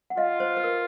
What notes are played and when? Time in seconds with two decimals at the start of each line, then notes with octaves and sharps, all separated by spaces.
0.10 F#5
0.17 F4 D#5 F5
0.40 C5
0.57 B4
0.64 A#4